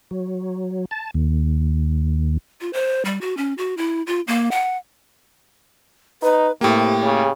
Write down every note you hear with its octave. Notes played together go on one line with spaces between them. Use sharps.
F#3
A5
D#2
F4
C5
G3
F#4
C#4
F#4
E4
F4
A#3
F#5
D#4 B4
A2 C3 A#3 G4
C#3